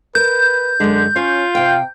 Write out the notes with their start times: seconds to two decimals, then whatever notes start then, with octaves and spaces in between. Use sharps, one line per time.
0.15 A#4 B4 G6
0.80 F#2 D3 G#3
1.16 C#4 F4 C#5
1.55 C3 F5 G5